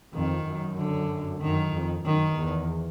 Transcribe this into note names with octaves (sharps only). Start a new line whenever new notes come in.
F2 D#3
F#2
D3
F#2 D#3
F2
F#2 D#3
E2